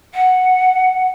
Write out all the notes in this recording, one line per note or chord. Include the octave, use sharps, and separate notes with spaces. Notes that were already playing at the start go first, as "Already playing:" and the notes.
F#5